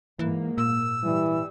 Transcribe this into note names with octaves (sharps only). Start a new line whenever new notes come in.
G#2 E3 A#3
A#2 E6
E3 G3